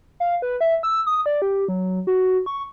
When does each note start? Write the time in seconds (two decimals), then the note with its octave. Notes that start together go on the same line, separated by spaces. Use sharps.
0.20 F5
0.42 B4
0.61 E5
0.83 E6
1.07 D#6
1.26 D5
1.42 G4
1.68 F#3
2.07 F#4
2.46 C#6